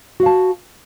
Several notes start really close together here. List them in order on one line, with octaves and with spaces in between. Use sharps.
F#4 F5 A5